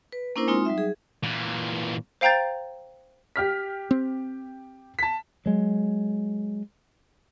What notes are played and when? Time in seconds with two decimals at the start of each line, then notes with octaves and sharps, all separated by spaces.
0.12 B4
0.36 A#3 C#4 D4 E4 A#4 C5
0.48 G#3 C4 D#4 F4 C6
0.65 F#3 G3 D#4 E5
0.78 G#4
1.23 A#2 E3
2.21 C5 F5 G5 A#5 G6 A6
3.36 G4 F6 B6
3.91 C4
4.99 A5 B6
5.46 F#3 G#3